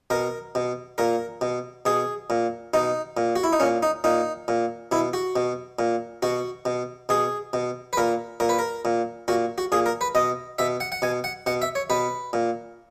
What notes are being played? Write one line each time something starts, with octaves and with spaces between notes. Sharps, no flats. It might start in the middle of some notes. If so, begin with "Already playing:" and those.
B2 A#4
B2
A#2 A#4
B2
B2 G#4
A#2
B2 D#4
A#2
F#4
E4
D#4
A#2 C#4
D#4
A#2 D#4
A#2
B2 E4
F#4
B2
A#2
B2 F#4
B2
B2 G#4
B2
B4
A#2 A#4
A#2 A#4
B4
A#4
A#2
A#2 F#4
F#4
A#2 G#4
A#4
B4
B2 D#5
B2 E5
F#5
F#5
B2 G#5
F#5
B2 F#5
E5
C#5
B2 B4
A#2